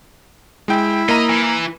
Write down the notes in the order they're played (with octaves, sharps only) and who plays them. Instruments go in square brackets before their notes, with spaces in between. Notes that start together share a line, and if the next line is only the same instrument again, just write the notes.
[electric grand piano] G#3 G5 [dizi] E4
[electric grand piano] A#3 A#5 D#7 [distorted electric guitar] D#5
[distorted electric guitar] E3